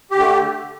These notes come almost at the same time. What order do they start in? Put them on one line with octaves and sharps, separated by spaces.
G4 D3 A3